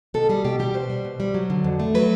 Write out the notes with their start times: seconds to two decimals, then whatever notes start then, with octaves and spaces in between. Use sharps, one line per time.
0.14 B2 A4
0.29 G3 G#4
0.45 B2 G4
0.59 G3 G4
0.74 B2 C5
0.90 G3
1.05 B2
1.20 G3
1.34 F#3
1.50 D3
1.64 F2
1.79 A3
1.95 F#3 B4